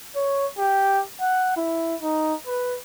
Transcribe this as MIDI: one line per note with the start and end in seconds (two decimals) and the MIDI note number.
0.16 0.46 73
0.58 1.00 67
1.21 1.56 78
1.57 1.96 64
2.02 2.34 63
2.47 2.76 71